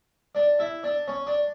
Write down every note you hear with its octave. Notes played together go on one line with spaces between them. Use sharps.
D4 D5
E4 E5
D4 D5
C#4 C#5
D4 D5